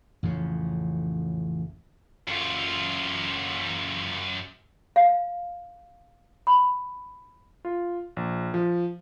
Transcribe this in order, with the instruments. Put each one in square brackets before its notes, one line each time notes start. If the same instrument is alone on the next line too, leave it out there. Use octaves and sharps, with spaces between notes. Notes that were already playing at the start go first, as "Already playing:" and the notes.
[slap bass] A1 F2 C#3
[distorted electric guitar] F#2 F4
[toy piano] F5
B5
[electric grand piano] F4
A#1
F3